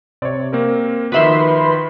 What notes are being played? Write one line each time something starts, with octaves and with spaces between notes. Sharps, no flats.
C3 C#5 D5
A#3 C4 A#4
D#3 F3 F#4 B4 E5 B5 C6